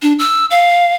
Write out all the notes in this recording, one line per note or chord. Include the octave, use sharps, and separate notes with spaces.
D4
E6
F5